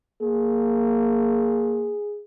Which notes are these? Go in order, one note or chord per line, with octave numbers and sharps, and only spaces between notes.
A#3 G#4